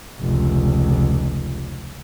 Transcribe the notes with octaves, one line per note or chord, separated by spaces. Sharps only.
F1 C#2